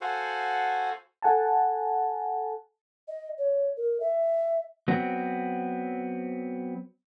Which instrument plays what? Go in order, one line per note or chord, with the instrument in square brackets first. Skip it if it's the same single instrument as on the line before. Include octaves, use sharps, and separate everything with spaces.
[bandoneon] F#4 A4 C5 F5 F#5 G#5
[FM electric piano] A4 F#5 G#5 A5
[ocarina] D#5
C#5
A#4
E5
[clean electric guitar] F#3 B3 C4